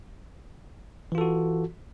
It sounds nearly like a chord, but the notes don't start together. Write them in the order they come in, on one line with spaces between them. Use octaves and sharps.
E3 F4 A4 F#4